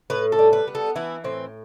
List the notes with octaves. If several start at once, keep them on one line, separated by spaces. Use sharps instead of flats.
A2 B4
A4
G3
B4
B3
A4
E3 E4
A2 C4